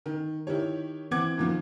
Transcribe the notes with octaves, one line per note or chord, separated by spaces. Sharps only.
D#3
D#3 E4 G4 C#5
E3 C4 F#5 D6 G#6
F#2 D#3 F3